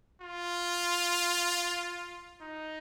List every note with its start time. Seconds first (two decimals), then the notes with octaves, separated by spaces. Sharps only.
0.22 F4
2.41 D#4